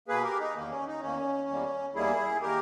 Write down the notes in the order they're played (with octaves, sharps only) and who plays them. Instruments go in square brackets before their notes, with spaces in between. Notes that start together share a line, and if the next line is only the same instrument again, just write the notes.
[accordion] B2 A#3 G#4 B4
G4 A#4
D#4
E2 D#3 A#3
C#4
D#4
E2 D#3 A#3 C#4
E2 D#3 G3 A#3
E2 D#3 G3 A#3 E4 G#4
D#3 A#3 G4 A#4